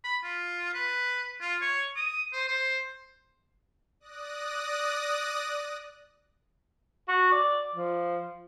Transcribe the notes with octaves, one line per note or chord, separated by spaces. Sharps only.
B5
F4
B4
F4
C#5
D#6
C5
C5
D5 D#6 F#6 A#6
F#4
D5
F3